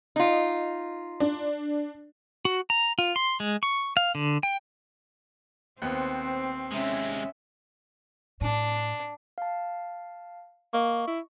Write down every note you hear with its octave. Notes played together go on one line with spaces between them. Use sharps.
D#4 F4
D4
F#4
A#5
F4
C6
G#3
C#6
F5
D3
G5
D#2 B3 C4 C5
C3 G#3 C#4 E5
A2 D4
F5 A5
A#3 D#5 C#6
E4